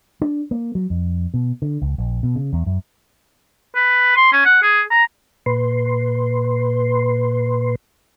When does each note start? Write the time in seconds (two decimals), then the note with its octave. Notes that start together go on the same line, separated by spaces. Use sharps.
0.21 D4
0.51 A#3
0.75 F#3
0.90 F2
1.34 B2
1.62 D3
1.82 C#2
1.98 A#1
2.23 B2
2.36 C#3
2.53 E2
2.66 F#2
3.75 B4
4.16 C6
4.33 C#4
4.45 F#5
4.62 G#4
4.90 A#5
5.46 A#2 B4 C6